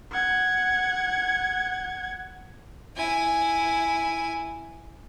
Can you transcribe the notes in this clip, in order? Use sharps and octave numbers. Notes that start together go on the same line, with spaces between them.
F#5 G#6
E4 G#5